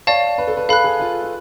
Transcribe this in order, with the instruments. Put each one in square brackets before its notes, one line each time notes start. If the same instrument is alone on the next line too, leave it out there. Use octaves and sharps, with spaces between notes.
[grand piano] C#5 [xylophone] D5 F5 A5
[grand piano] B4
A4
B4
[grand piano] A4 [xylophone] F5 B5 F#6
[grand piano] G#4
F4
F4